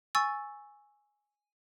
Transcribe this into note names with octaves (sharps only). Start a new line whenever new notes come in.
G#5 C#6 E6 A6